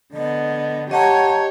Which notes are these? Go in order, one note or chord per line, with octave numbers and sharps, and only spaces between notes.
D3 B3 D#5
G4 C#5 D#5 F#5 A5 A#5